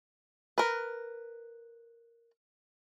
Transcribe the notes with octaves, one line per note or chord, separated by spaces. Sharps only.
A#4 B4